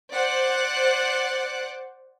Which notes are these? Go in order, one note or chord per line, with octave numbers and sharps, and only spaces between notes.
C5 D5 F#5